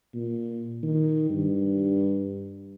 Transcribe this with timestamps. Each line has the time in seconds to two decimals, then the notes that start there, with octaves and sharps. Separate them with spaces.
0.14 A#2
0.83 D#3
1.30 G2